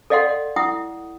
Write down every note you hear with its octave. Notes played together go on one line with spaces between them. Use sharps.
A4 D5 D#5 F5 F#5 C6
E4 F#5 D#6